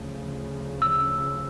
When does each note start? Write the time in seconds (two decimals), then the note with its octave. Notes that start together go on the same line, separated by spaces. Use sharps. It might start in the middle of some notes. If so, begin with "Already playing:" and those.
Already playing: D2 C#3 F3
0.82 E6